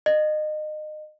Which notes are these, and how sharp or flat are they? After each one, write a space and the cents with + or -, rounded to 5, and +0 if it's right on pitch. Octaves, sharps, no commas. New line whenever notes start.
D#5 -30